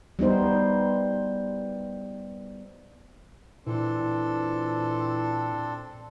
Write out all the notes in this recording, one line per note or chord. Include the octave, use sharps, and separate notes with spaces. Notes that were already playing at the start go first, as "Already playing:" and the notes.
G3 B3 D#4 C5
A#2 E3 C4 D4 A4